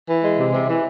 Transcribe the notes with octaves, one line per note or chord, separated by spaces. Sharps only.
E3
G#3
C3
C3
E3